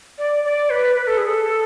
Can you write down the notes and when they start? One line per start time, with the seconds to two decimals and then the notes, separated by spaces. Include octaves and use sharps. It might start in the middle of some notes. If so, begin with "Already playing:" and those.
0.18 D5
0.44 D5
0.70 B4
0.95 B4
1.07 A4
1.17 G#4
1.27 A4